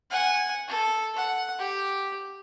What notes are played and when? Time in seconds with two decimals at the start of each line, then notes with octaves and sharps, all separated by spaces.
0.10 F#5 G#5
0.68 A4
1.16 F#5
1.59 G4